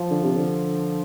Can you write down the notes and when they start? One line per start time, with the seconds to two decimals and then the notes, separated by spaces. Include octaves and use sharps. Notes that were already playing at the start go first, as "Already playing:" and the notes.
Already playing: F3
0.11 D3
0.24 C3
0.36 D3